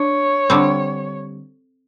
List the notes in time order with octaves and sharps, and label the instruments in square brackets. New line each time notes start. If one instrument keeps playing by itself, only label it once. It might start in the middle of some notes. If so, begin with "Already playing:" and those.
Already playing: [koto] D4 [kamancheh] C#5
[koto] D3 G3 C4